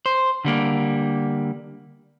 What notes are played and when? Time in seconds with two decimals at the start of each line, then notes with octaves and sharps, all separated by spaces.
0.06 C5
0.45 D3 G3 A#3